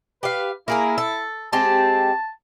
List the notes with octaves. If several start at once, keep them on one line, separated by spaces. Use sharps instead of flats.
G4 B4 F5
A#3 E4 G#4 A#4
A4
G#3 C4 G4 A5